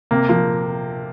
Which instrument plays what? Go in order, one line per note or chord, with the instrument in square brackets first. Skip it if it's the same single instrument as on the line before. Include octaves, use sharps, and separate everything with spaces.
[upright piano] C3 [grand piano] A#3
[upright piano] F3 [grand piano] A#3